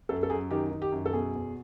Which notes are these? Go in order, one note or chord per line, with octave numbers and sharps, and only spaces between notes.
F#2 A4
A4
F#2 G#4
D#3 G4
D#3
G4
F#2
A4
B2 G#4
E2